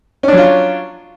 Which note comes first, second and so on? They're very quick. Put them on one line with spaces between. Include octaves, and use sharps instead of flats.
C#4 D4 F#3 F4